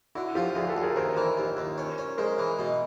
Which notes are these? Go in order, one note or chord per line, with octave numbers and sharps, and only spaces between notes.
D3 E4 F#4
F3 F4 G4
D2 F#4 G#4
G4 A4
D2
G#4 A#4
D#2 A#4 C5
E3 A#4 C5
D#2
D#2
C#4
C#4
G#3 A#4 C5
E3
B2